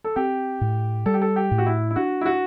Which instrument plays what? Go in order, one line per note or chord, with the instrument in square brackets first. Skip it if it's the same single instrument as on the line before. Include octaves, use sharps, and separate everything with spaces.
[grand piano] A4
[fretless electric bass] C4 [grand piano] G4
[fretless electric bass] A2
[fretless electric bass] G3 [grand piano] A4
[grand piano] G4
A4
G4
[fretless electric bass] A2
[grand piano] F#4
E4
E4
[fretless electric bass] D4 [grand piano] F#4
[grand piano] E4
F#4